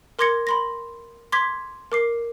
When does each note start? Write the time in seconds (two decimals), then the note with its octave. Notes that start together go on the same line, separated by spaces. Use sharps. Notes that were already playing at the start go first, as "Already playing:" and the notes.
0.19 A#4 C6 D6 G#6 A#6 C#7
0.47 B5 C6 A#6
1.32 C6 D6 G#6 B6
1.92 A#4 D6 C7